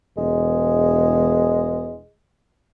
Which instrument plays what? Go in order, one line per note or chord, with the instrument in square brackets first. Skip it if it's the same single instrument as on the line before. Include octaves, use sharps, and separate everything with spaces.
[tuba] E1 [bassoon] G#3